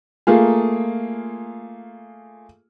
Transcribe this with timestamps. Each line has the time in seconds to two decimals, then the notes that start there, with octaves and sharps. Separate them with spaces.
0.27 A3 A#3 F4 G#4